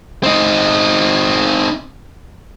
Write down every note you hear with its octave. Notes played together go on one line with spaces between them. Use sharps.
C4 D#4